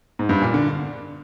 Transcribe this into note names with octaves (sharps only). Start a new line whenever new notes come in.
G#2
G2
A#2
D3